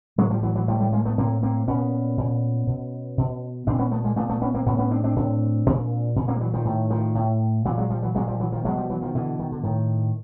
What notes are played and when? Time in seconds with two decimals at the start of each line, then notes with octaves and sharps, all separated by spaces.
0.18 A2 F#3 G#3
0.30 F3 G3
0.43 E3 F#3
0.55 E3 F#3
0.68 A2 F3 G3
0.80 G3 A3
0.93 G#3 A#3
1.05 A3 B3
1.18 A2 A#3 C4
1.43 A#3 C4
1.68 A#2 B3 C#4
2.17 A#2
2.67 B2
3.17 B2
3.67 A#2 C4 D4
3.79 B3 C#4
3.92 A3 B3
4.04 G#3 A#3
4.16 A#2 A3 B3
4.29 A3 B3
4.42 B3 C#4
4.54 A#3 C4
4.66 A2 B3 C#4
4.79 B3 C#4
4.91 C4 D4
5.04 C4 D4
5.16 A2
5.66 A#2
6.16 A#2
6.28 A#3 C4
6.36 G3
6.40 E3 F#3
6.54 D#3 F3
6.65 A2 D#3
6.90 D#3 F3
7.15 A2
7.65 A#2 E3 F#3
7.78 F#3 G#3
7.90 F3 G3
8.02 E3 F#3
8.15 A#2 F#3 G#3
8.28 F3 G3
8.40 E3 F#3
8.52 D#3 F3
8.65 B2 F#3 G#3
8.77 F3 G3
8.90 E3 F#3
9.02 D#3 F3
9.14 B2 D3 E3
9.39 D#3
9.52 D3
9.64 A2 D#3